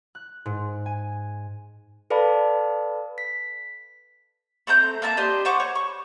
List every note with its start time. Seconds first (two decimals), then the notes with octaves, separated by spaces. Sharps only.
0.15 F#6
0.46 G#2
0.86 G#5
2.10 A4 B4 D5 F5 A5 B5
3.18 B6
4.67 A3 C4 A#5 G6
5.02 A#3 E5 A5 A#5
5.17 D4 G4 C5 D#5
5.45 C5 F#5 C#6 D6
5.60 C#5
5.75 C#6